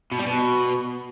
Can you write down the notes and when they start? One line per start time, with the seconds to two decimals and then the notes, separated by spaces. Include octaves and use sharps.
0.12 B2
0.19 G3
0.26 B2